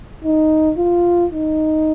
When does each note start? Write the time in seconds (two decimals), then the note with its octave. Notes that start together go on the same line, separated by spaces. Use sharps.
0.24 D#4
0.77 F4
1.32 D#4